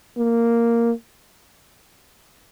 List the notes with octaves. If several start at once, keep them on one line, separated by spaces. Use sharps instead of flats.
A#3